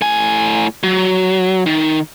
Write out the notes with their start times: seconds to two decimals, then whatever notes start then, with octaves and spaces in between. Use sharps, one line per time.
0.01 A2 G#5
0.83 F#3
1.66 D#3